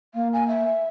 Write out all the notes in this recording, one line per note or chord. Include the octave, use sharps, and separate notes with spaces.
A#3 F5
G#5
E5